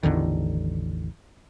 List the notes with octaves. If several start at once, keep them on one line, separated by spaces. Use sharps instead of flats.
A1 E2 D3 D#3